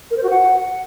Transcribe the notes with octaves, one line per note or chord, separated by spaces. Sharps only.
A#4
C5
F#4
F#5